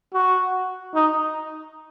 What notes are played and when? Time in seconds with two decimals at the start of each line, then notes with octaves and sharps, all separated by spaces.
0.14 F#4
0.95 D#4